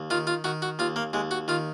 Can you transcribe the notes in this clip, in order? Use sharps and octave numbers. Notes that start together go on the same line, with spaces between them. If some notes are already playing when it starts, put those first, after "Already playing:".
Already playing: D#2
D#3 F4
F4
D#3 F#4
F#4
D#2 F4
A#3
D#2 G#3
F#4
D#3 F4